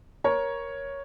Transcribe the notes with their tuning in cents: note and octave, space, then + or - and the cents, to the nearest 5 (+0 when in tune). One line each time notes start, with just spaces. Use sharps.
A#4 +15 C#5 +0